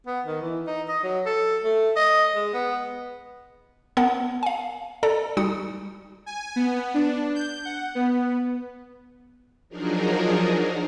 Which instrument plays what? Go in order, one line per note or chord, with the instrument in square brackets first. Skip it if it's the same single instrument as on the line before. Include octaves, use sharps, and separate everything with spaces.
[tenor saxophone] B3
D#3
E3
D#4
D#5
F#3
A4
A3
D#5
G#3
B3
[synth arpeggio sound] B3 A#4 F#5 A5
F5 G#5
A4 D5 A5 A#5
G3 D#4 F#4 D#6 C#7
[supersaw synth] G#5
B3
D4
G6
F#5
B3
[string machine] F3 F#3 D4 D#4 G#4 A#4